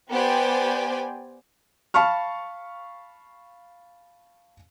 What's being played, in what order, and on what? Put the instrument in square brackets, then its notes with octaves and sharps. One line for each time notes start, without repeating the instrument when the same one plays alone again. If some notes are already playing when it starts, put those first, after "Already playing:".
[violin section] B3 G4 C5 D5 G5 G#5
[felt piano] F5 A5 B5 C#6 F6